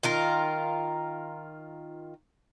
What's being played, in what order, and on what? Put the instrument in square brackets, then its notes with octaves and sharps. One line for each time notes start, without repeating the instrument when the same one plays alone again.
[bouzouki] D#3 F4 A#4